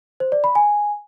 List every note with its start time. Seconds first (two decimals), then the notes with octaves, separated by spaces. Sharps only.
0.20 C5
0.32 D5
0.44 B5
0.55 G#5